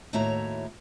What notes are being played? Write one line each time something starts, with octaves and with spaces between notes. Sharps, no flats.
D#2 A2 E4 F#4 C#5 A#5